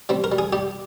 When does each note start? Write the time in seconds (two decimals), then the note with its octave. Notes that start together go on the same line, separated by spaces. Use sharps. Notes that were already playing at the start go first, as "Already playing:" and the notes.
0.09 G3 C4
0.24 A#4
0.32 G3
0.38 G#4
0.53 G3 G4